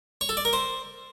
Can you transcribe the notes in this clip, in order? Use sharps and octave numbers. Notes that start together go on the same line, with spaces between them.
C#5
A4
D5
A#4
C5